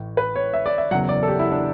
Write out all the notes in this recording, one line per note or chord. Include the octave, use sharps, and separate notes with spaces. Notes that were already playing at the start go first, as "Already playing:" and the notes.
Already playing: A1 A2 E3
B4
C#5
E5
D5
E5
F#1 E2 C#3 F#3 F#5
D5
A4
G4
E4
D4